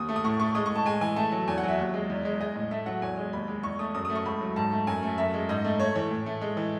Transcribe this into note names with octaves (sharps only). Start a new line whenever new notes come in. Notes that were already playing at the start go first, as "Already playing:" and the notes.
Already playing: D#2 D#6
A3
D#6
A2 C#6
A3 C#6
G#3 D#6
A2 C#6
A5
G#3 G#5
E3 G#5
A3 A5
F#3
E2 G#5
F#5
F#3
E5
D#2
G#3
E2
G#3
G#3 D#5
A2
A3 E5
F#3 F#5
E2 G#5
G#3
D#2 B5
G#3
E2 C#6
A3 D#6
F#2 D#6
D#6
A3
C#6
C#2 B5
F#3
G#2 A5
A3
F#2 G#5
A3
F#2 E5
G#3
G#2 D#5
A3
A3 C#5
E3 C#5
A2
A3
G#3
E3